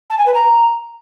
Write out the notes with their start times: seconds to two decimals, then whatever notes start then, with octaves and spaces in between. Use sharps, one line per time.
0.10 A5
0.18 G#5
0.26 B4
0.34 A#5